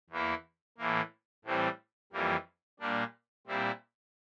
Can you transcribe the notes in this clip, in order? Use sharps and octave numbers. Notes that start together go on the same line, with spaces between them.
E2 E3 A#3 E4
A2 E3 A#3
A2 E3 G3 C4
F2 E3 G3 A#3
A#2 G3 A#3 D4
A#2 G3 C4 E4